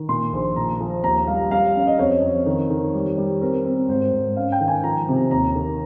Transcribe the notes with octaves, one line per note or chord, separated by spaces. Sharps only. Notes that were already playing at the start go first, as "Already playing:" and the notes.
Already playing: D#3
A#2 C6
A#1
A#2 A#5
F3
D#2 A#5
G3 F5
G3 F5
C#4
D#5
F2 C#5
F2
D#3
D#3
G3
G3
C4 A#4
C4
G#2 C5
G#2
C#4 F5
G5
D#3
G#5
F3 A#5
C3
D#2 A#5
D#3